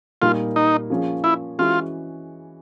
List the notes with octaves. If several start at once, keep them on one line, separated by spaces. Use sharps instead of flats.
A#2 G3 A#3 D#4 F4
D#4
F3 A#3 C#4 F4 G#4
E4
E3 G#3 C#4 F4 F#4